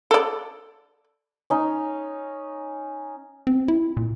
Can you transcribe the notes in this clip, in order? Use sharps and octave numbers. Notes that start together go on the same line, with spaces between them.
A4 D5
C#4 D#4
C4
E4
A#2